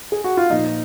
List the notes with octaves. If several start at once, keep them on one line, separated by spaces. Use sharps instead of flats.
G#4
F#4
F4
A#2 F3 D#4